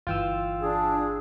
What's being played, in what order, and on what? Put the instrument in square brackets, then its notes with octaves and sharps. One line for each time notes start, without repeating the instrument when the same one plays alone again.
[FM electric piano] G1 E3 E6 [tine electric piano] F4 G5
[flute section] D4 [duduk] G#4